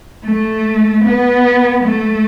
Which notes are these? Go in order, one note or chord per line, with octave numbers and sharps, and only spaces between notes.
A3
B3
A3